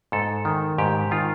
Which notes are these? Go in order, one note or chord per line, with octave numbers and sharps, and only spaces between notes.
G#2 A4
D#3
G#2 G4
D#3 F4